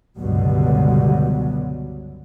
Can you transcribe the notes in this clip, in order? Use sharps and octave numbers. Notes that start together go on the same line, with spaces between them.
C#2 G2 B2 D3 F#3 G3